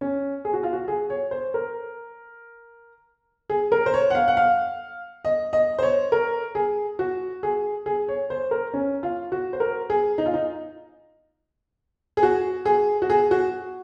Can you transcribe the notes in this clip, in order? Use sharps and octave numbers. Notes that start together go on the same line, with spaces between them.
C#4
G#4
F#4
F4
F#4
G#4
C#5
C5
A#4
G#4
A#4
C5
C#5
F#5
F5
F#5
F5
D#5
D#5
C5
C#5
A#4
G#4
F#4
G#4
G#4
C#5
C5
A#4
C#4
F4
F#4
C5
A#4
G#4
D#4
F4
D#4
G#4
F#4
G#4
F#4
G#4
F#4